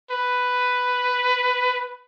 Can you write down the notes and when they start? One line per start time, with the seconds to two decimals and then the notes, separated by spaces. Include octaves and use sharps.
0.11 B4